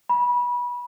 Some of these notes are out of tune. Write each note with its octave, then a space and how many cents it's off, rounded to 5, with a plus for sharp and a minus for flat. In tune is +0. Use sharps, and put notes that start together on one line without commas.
B5 -25